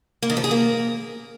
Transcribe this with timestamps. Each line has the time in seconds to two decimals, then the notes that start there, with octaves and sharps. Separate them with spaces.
0.23 A#3
0.30 D#3
0.37 F3
0.44 G#4
0.51 A#3